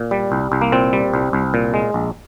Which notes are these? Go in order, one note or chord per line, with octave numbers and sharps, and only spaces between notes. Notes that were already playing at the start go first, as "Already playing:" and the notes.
Already playing: A#2
G3
C2
C2
A#3
A#2 C4
G3
C2
C2
A#2
G#3
A#1